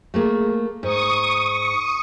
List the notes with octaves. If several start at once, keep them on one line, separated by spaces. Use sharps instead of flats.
A3 A#3 G#4
G#2 C#6 D#6